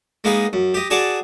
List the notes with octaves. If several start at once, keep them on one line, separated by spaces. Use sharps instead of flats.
G#3 A#3 B3 D#4 G#4
F#2
G4 D#5
F#4 G#4 D5 A5 C#6 D6